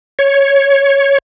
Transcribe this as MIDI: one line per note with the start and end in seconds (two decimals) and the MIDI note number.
0.19 1.18 73